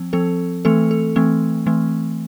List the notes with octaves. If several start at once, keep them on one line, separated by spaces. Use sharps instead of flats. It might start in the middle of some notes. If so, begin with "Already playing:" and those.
Already playing: F3 C4
F3 C4 A4
E3 A3 C4 A4
A4
E3 A3 C4
E3 A3 C4